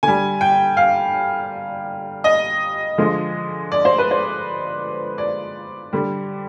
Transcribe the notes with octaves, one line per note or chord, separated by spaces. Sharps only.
D3 G3 G#5
G5
F5
D#5
D3 F3 G#3
D5
C5
B4
C5
D5
D3 G3